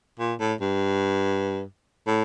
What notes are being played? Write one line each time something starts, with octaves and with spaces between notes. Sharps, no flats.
A#2
A2
G2
A2